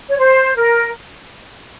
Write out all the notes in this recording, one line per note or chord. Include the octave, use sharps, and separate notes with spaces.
C#5
C5
A#4